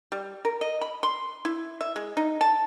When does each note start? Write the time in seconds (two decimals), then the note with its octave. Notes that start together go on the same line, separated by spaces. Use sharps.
0.12 G3
0.45 A#4
0.61 D#5
0.81 B5
1.03 C6
1.45 E4
1.81 E5
1.96 G#3
2.17 D#4
2.41 A5